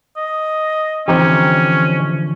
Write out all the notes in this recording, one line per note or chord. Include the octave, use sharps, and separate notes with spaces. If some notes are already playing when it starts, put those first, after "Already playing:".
D#5
D3 E3 F3 C4 C#4 D#4 G4